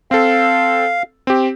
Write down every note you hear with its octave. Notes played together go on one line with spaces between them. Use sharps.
C4 A4 F5
C4 G4